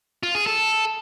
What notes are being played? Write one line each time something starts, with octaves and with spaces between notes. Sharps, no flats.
F4
G#4
A4